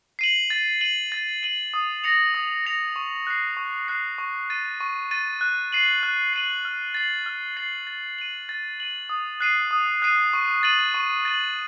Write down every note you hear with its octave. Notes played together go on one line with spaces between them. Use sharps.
C7 D#7 F#7
A6
D#7 F#7
A6
D#7 F#7
D#6
A#6 C#7 F7
D#6
A#6 C#7 F7
C#6
F#6 C7
C#6
F#6 C7
C#6
A6 D#7
C#6
A6 D#7
F#6
C7 D#7 F#7
F#6
C7 D#7 F#7
F6
A6 C7 F#7
F6
A6 C7 F#7
A6
D#7 F#7
A6
D#7 F#7
D#6
F#6 C7 D#7
D#6
F#6 C7 D#7
C#6
A6 D#7 F#7
C#6
A6 D#7 F#7